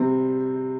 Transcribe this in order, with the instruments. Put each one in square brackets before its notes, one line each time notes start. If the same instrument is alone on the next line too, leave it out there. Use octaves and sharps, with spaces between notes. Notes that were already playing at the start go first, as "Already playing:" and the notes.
Already playing: [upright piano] C3 G3 C4